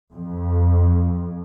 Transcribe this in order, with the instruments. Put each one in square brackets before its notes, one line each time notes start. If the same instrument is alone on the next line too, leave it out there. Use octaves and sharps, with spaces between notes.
[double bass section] F2